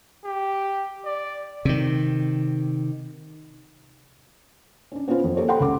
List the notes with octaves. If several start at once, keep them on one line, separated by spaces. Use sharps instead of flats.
G4
D5
C3 D#3
C#4 D4
B3 C#4 D4 F4 B4 C5
F2
A#3 G4 A4 C#5
A4 F#5 G5 B5 C6
C#2 D6